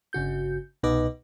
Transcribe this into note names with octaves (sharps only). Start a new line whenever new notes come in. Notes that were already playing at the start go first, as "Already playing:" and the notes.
G1 C#3 F#4 G6
C2 B2 D#4 B4 D#5 D6